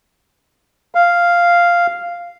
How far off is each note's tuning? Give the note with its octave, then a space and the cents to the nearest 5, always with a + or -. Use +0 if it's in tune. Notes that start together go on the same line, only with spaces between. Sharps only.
F5 -5